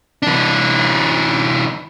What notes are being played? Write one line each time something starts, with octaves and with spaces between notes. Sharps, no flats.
E3 D4